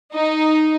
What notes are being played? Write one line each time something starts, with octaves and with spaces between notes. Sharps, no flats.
D#4